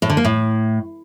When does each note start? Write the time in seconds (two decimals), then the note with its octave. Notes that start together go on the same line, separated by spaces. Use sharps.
0.02 A2
0.10 D3
0.17 A#3
0.25 A2